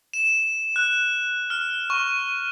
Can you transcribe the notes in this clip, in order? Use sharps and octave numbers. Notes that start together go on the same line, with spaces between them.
E7
F#6
F6
C#6